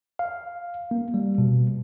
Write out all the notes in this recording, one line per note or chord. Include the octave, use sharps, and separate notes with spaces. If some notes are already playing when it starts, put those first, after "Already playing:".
F5
A#3
G3
B2